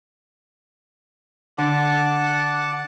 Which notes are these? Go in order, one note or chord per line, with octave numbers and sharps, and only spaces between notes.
D3 F#5 A5 D6